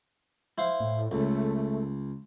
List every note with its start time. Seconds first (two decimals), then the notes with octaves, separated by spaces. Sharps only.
0.58 E4 C5 F5
0.80 A2
1.11 C#2 A3